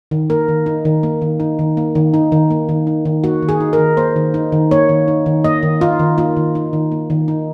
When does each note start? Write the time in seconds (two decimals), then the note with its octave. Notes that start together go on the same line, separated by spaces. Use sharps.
0.11 D#3
0.30 A#3 A#4
0.48 D#3
0.66 D#4
0.85 D#3
1.03 A#3
1.22 D#3
1.40 D#4
1.59 D#3
1.77 A#3
1.95 D#3
2.14 D#4
2.32 D#3
2.50 A#3
2.69 D#3
2.87 D#4
3.05 D#3
3.24 A#3 F#4
3.42 D#3
3.49 G#4
3.60 D#4
3.73 A#4
3.79 D#3
3.97 A#3 C5
4.16 D#3
4.34 D#4
4.52 D#3
4.71 A#3 C#5
4.89 D#3
5.08 D#4
5.26 D#3
5.44 A#3 D#5
5.63 D#3
5.81 D#4 F4
5.99 D#3
6.18 A#3 F4
6.36 D#3
6.55 D#4
6.73 D#3
6.92 A#3
7.10 D#3
7.28 D#4